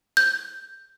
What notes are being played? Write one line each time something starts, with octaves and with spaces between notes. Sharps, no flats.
G6